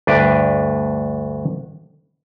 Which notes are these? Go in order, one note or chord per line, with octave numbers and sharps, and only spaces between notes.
D2 G2 D4 B4 G5